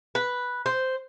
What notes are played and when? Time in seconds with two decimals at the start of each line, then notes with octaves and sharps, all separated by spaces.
0.15 B4
0.66 C5